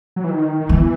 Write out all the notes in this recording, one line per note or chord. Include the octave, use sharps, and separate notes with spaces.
F#3
E3
D#3
D#3
E3 B3